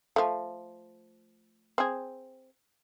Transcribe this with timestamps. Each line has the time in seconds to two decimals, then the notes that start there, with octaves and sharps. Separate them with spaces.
0.16 F3 A3
1.78 C4 G#4